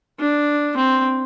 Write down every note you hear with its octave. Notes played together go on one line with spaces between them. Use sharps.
D4
C4